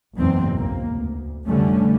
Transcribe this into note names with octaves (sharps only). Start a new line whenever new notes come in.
F#1 E2 G#2 C4
B1 A#3
D2
F1 D3 F3 G3 A3 C#4